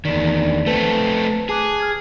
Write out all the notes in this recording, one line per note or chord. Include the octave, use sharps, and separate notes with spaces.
E2 D#3 D5 B6
D4 D5
A3 C4 B4 A5 B6
G#4 A5 D6 F#6
F6 G#6